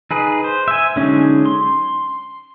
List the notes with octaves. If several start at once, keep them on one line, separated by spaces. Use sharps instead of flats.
D#4 G#4 B4
C5
E5 G#5
D3 F#3 G#3 C#4 D#4
C6